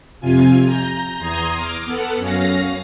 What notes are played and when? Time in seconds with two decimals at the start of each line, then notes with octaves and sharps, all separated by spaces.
0.21 F2 C3 F4 G#5
0.66 A#5 G6
1.18 E2 A#5 C6 D#6 G#6
1.55 D6 F6
1.85 B3 A4 F#5
2.17 F#2 C#4 F5 A#6